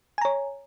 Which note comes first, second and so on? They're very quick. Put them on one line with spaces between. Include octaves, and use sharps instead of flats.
G#5 A#5 C#5